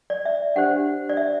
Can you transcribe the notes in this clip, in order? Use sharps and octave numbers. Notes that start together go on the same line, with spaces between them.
D5
E5
D4 G4 C5 F#5
D5
E5